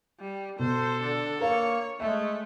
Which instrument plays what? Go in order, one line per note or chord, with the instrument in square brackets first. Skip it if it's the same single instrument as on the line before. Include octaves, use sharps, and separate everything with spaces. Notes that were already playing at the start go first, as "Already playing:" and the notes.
[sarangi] G3
[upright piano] B2 [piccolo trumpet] A4 [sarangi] C5
[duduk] D3 [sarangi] D4
[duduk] A#3 [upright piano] A#4 F5 [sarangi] C#5
[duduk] G#3 [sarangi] A3 [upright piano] E5